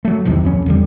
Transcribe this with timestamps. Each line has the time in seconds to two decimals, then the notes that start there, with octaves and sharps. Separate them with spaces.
0.05 F#3 A3
0.25 B1 E2 C3 D#3
0.43 D1 F2 C#4
0.66 E2 D3 G3